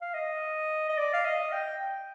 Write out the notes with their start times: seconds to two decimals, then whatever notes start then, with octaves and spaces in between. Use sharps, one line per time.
0.02 F5
0.14 D#5
0.89 D#5
0.97 D5
1.13 F5
1.25 D#5
1.52 G5